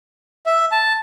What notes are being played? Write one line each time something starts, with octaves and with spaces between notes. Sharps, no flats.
E5
A5